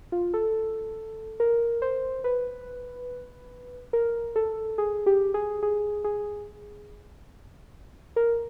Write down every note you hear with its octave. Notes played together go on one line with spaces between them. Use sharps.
F4
A4
A#4
C5
B4
A#4
A4
G#4
G4
G#4
G#4
G#4
A#4